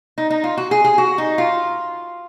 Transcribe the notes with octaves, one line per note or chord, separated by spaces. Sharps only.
D#4
D#4
F4
F#4
G#4
G#4
F#4
D#4
F4